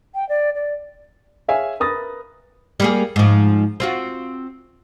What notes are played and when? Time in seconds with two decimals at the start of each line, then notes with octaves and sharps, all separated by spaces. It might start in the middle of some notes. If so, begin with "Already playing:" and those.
0.15 G5
0.29 D5
0.55 D5
1.48 G#4 C#5 E5 F5 G#5
1.80 A#4 B4 D#6 A6 A#6
2.80 G3 A#3 G#4
3.16 G#2 F3
3.80 C4 F4 F#4